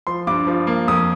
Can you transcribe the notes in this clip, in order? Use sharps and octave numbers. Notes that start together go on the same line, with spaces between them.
F3 C6
G2 D6
F3
A#3
F2 D#6